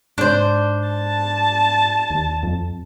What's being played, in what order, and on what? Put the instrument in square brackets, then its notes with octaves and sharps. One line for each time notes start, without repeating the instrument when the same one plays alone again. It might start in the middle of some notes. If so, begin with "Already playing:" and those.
[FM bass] G#2 [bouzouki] D4 C5
[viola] A5
[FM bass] D#2
F2